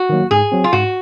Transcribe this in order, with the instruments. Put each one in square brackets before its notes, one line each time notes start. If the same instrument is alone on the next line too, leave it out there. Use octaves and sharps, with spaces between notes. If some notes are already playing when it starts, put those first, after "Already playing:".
Already playing: [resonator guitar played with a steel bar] F#4
[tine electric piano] D#3 F#3 A#3
[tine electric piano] G#2 [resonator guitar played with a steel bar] G#4
[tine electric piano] F#3 C4
[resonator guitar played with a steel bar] F4
[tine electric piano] G#2 [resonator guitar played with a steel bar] F#4